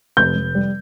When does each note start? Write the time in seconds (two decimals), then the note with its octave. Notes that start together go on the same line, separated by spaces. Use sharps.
0.17 F1 G6
0.36 F1
0.55 G3